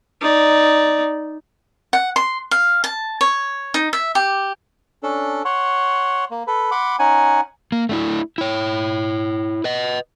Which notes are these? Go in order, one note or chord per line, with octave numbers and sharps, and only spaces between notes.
D#4 D5
F#5
C6
F5
A5
C#5
D#4
E5
G4
C#4 D4 A4
C#5 F#5 C6
A#3
A4 B4
F#5 B5 C6 D6
C#4 D#4 F#5 G#5
A#3
A3 D4 E4
E4 C#5
B4 D#5